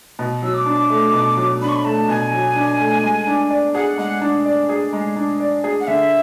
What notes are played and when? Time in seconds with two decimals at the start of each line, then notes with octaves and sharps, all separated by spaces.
0.19 B2
0.42 F#3 E6
0.54 D6
0.66 D4
0.90 A3
1.13 B2
1.37 F#3
1.61 D4 B5
1.69 C#6
1.76 B5
1.85 A3 A5
2.08 B2 G#5
2.32 F#3
2.56 D4
2.79 A3
3.03 G#3
3.27 D4
3.50 D5
3.75 G#4 F#5
3.98 G#3 F#5
4.21 D4
4.46 D5
4.69 G#4
4.93 G#3
5.17 D4
5.40 D5
5.64 G#4
5.80 F#5
5.87 D3 E5